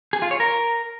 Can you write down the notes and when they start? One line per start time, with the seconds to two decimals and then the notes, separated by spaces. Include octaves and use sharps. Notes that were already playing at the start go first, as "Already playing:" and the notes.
0.13 G#4
0.22 F4
0.31 C#5
0.40 A#4